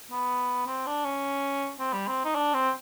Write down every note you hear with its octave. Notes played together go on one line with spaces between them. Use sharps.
B3
C4
D4
C#4
C4
G3
C4
D#4
D4
C4